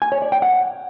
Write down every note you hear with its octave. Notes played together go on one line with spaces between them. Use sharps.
G#5
C#5
D5
G5
F#5